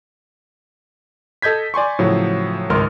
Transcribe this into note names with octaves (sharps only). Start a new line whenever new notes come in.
A4 D#5 G6 G#6 B6
D5 G#5 C6 C#6
A2 C#3 F3 F#3
G#1 C#2 A#4 C6 F6